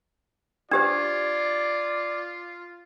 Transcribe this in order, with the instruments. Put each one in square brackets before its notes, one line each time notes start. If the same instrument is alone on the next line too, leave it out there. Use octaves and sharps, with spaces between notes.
[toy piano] D4 G4 C5 [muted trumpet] F4 [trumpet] D5 [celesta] G#6